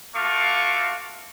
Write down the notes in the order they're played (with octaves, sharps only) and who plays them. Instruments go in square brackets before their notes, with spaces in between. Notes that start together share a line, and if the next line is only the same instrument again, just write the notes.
[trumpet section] A3 F4 F#4 F5 C#6 D6